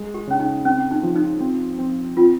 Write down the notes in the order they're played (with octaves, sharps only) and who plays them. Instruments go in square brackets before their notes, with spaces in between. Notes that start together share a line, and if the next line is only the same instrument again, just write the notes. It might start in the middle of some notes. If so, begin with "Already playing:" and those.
Already playing: [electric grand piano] G#3
[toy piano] G4
[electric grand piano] C#3 [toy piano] C#4
[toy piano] D#4
[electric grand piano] C4 [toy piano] C#4
[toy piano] D#4
[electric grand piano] F3
[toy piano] D#4
[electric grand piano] C4
C4
[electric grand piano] C4 [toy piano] F4